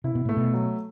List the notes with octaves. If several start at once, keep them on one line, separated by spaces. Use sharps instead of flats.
C3 E4
B2
A2 A3
B2
F#3